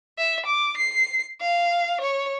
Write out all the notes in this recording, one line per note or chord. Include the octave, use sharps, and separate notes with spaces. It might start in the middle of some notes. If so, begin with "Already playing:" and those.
E5
D6
C7
F5
C#5